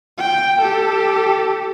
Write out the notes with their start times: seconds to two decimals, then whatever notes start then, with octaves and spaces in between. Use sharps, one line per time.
0.18 G5
0.61 G4 A4